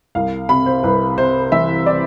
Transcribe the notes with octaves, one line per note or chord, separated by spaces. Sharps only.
C2 F5
C3 B5
C5
C2 B4
C3 C5
E3 E5
D5